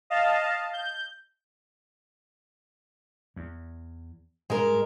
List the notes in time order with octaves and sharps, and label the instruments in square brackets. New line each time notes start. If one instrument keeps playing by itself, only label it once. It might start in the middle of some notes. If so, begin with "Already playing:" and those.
[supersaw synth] D#5 F5 A5
G6
[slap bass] E2
[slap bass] G#2 G3 [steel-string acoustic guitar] G#3 A#4